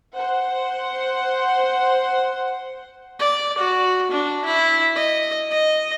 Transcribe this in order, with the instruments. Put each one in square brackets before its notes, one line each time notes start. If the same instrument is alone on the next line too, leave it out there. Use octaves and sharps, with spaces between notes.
[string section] C5 F#5
[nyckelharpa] D5
F#4
D4
E4
D#5
D#5